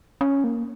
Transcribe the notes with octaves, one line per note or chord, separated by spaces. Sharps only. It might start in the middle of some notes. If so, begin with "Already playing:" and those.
C#4
A#3